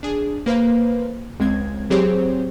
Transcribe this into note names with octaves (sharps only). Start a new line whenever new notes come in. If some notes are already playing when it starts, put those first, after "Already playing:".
D4 G#4
A#3 B4 C5 F5
C#2 G#3 C4 G#6
F#3 C4 G4 G#4 C5 C#5